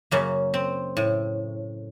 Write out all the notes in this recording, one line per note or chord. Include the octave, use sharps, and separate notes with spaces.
F#2 C#3 A#3
C4
A2